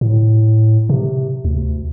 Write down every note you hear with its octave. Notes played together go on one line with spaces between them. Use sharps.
A2
C3
D2